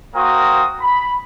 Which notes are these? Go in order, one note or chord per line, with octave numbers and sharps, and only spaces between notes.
A#3 F#4 A#4 C5 G5 D#6
B5